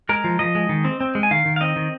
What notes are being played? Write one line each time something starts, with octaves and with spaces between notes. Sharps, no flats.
G#3 A#4
F3
F3 D#5
G#3
D#3
C4
C4
G#3
G#5
D#3 F5
D#3
F5
C4 D#5
D#3